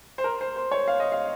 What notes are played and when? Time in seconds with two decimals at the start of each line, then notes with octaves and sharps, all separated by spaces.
0.18 C5
0.24 A#4
0.41 C5
0.56 C5
0.72 C#5
0.88 F5
1.00 D#5
1.12 F5